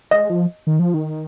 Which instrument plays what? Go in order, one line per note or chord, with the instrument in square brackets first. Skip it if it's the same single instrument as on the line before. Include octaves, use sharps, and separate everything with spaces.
[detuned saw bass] G#3 [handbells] D#5
[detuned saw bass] F3
D#3
F3
D#3